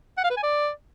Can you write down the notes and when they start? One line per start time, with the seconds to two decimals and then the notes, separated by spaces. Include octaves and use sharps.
0.17 F#5
0.24 F5
0.30 B4
0.37 G#5
0.43 D5